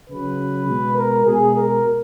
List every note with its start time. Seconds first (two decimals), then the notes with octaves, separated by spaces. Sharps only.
0.09 C#3 F#3 B4
0.68 B2 G#3
0.97 A#4
1.25 B2 G#3 G#4
1.54 A#4